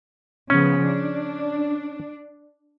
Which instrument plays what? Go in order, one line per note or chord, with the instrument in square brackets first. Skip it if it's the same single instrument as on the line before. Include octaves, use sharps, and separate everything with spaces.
[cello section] C#3 F3 B3 [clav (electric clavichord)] C#4
[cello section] D4